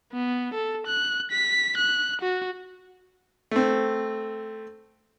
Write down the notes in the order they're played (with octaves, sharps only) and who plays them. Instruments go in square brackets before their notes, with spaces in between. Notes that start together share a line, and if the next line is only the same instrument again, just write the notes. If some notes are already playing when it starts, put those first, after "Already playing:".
[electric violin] B3
A4
F#6
B6
F#6
F#4
[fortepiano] A3 C4